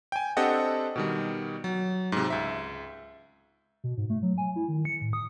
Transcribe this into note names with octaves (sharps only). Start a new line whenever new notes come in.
G5 G#5
C4 D4 G4 A4 D#5 F#5
B2 D#3 G3
F#3
G#2 C3
C#2 E5
B2
G#2
A3
F#3
G#5
E4
D#3
C#7
A2
D#6